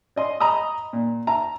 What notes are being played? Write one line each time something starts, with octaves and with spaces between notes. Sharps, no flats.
D5 D#5 C6
D#5 A#5 B5 D#6
A#2
E5 A5 A#5